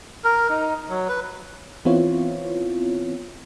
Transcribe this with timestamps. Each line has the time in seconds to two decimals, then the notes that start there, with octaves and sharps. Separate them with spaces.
0.24 A#4
0.49 D#4
0.89 F#3
1.09 B4
1.85 E3 B3 C4 E4 F4 C#5